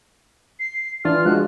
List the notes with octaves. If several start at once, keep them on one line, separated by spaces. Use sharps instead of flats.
C7
E3 D4 F4 F6
F3 G#3 F#4 F#6